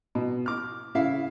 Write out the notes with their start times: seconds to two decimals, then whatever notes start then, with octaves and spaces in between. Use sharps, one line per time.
0.15 B2
0.46 D6 F6
0.95 C#3 E4 E5 F5